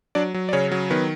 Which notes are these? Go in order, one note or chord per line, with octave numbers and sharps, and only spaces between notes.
F#3 D4 D5
F#3
D5
C#3 C#4 C#5
F#3
D#3 B3 B4